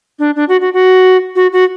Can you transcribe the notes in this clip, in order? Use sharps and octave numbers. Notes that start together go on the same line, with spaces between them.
D4
D4
F#4
F#4
F#4
F#4
F#4